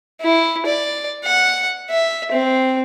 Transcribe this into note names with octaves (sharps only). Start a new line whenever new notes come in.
E4
D5
F#5
E5
C4